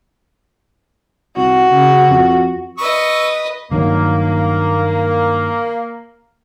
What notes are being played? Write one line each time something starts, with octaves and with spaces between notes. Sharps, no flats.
C2 F#4
C#3
F2
B4 D#5 C#6 D#6 E6
G2 D#3 F#3 A#3